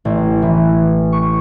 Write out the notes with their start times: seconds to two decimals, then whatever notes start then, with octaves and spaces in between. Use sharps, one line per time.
0.05 A1
0.42 E3
1.13 C#6